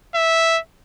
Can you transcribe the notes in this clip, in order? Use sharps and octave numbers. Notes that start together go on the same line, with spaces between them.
E5